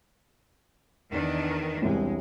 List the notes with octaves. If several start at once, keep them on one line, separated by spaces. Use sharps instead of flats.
E2 D#3 D4
E1 C2 C3 G#3